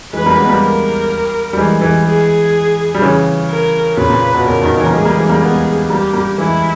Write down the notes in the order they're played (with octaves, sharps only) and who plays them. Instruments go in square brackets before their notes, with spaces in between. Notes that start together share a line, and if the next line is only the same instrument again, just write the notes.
[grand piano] E3 G#3 [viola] B4
[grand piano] G3 A#3
G#3 B3
G3 A#3
[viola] A#4
[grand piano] G3
E3 G#3
E3 G#3
[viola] G#4
[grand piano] G3
C#3 E3
[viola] A#4
[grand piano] A#2 C#3 [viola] B4
[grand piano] A#2
B2
[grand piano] A#2 C#3 [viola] A#4
[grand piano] B2 D#3
C#3 E3
A#3
[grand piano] E3 G#3 [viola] G#4
[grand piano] G3 A#3
E3 G#3
G3 A#3
[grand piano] G#3 B3 [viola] G#4
[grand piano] G3 A#3 [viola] G4
[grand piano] G3 A#3
[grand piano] E3 G#3 [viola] E4